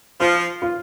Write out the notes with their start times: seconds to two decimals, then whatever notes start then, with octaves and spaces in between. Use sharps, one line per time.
0.20 F3 F4
0.62 F4